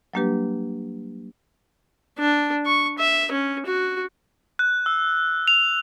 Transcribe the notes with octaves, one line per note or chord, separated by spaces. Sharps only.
F#3 G3 A#3 D4 G4 B4
D4
C#6
E5
C#4
F#4
F#6
E6
F7